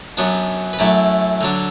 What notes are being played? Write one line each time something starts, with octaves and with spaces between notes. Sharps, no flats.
F#2 F#3 B3 D4
B4
F#2 F#3 A3 E4 D5
D3 F#3 D4